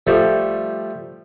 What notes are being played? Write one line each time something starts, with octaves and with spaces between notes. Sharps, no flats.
F3 G3 A3